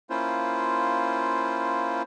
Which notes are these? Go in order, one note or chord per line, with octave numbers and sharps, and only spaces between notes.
A#3 C#4 E4 F4 C5